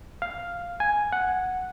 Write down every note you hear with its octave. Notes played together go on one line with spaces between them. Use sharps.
F5
G#5
F#5